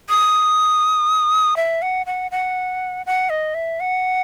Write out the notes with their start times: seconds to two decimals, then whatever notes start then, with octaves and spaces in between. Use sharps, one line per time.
0.09 D#6
1.57 E5
1.82 F#5
2.06 F#5
2.31 F#5
3.06 F#5
3.30 D#5
3.54 E5
3.80 F#5